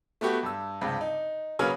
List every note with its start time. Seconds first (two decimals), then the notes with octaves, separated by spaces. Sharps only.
0.21 A3 B3 F#4 G4
0.43 G2 E6
0.81 C#2 G2 C3
1.01 D#4
1.59 C#3 F#3 A#3 C#4 B4 F6